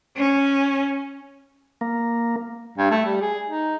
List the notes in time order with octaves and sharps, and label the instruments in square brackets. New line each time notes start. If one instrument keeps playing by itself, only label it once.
[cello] C#4
[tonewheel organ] A#3
[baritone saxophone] G2
A3
G3
G#4
D#4